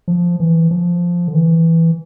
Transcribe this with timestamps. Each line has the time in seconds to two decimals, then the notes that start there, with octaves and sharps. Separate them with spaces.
0.08 F3
0.40 E3
0.71 F3
1.28 D3
1.34 E3